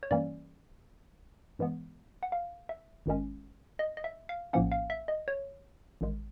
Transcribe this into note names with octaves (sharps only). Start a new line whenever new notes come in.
C#5
G2 E3 G3 A#3 C#4 D5
G2 E3 G#3 B3
F#5
F5
E5
G#1 G2 D#3 G#3 C#4
D#5
D#5
E5
F5
A#1 A2 F3 A#3 C#4 F#5
F5
E5
D#5
C#5
A1 G2 D#3 G#3